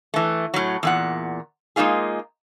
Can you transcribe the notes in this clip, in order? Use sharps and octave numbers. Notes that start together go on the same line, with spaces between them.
E3 A3
A2 F#3
E2 A#2 F#5
G#3 A#3 D#4 F4 G#4